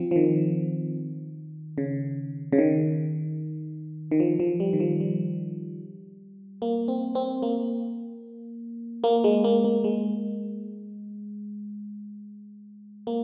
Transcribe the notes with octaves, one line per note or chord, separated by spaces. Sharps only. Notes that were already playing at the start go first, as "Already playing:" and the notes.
Already playing: F3 C4
F3
D#3
C#3
C#3
D#3
D#3
F3
F3
G3
D#3
F3
G3
A#3
C4
C4
A#3
A#3
G#3
A#3
A#3
G#3
A#3